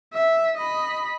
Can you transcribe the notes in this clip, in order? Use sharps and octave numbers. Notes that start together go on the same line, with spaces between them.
E5
D#5 B5